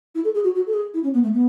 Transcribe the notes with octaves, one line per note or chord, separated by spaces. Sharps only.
E4
A4
G#4
F#4
F#4
A4
G#4
E4
C#4
B3
A3
B3